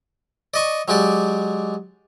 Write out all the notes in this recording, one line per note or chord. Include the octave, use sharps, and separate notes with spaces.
D5 D#5 C#6
F#3 G#3 G4 D5